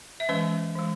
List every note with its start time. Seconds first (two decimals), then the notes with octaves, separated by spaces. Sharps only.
0.20 E5
0.29 E3 G#3 C#4 B4 D#5
0.76 E3 G#3